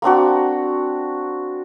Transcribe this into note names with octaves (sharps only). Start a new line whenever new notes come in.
A#3 C4 D4 F#4